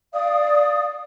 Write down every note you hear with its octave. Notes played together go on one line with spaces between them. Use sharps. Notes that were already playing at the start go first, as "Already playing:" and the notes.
D5 F5 D#6